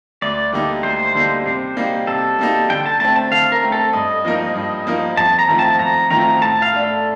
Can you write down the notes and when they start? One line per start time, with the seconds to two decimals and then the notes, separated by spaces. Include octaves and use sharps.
0.22 D2 D5
0.52 D3 G3 A#3 D#4
0.83 D2 C5
1.14 D3 G3 A#3 D#4
1.46 C3
1.77 G3 A#3 D#4
2.07 C3 A4
2.39 G3 A#3 D#4
2.70 D3 G5
2.86 A5
3.00 A3 C4 A5
3.16 A5
3.32 D3 F5
3.52 A#4
3.62 A3 C4
3.72 A4
3.93 G2 D#5
4.25 F3 A#3 D#4 A#4
4.55 G2
4.87 F3 A#3 D#4 A#4
5.17 F2 A5
5.39 A#5
5.48 D#3 A3 C4 F4
5.59 A5
5.79 F2 A#5
6.10 D#3 A3 C4 F4 A#5
6.41 A2 A5
6.62 F5
6.72 A3 D4
6.83 A4